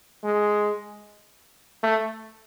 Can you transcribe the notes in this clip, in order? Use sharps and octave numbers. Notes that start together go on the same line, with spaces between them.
G#3
A3